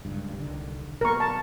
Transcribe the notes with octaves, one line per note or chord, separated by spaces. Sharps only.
F#1 C#2 G2
C2 D3 D#3
B1 B2 A#3 A#4 C#6
A5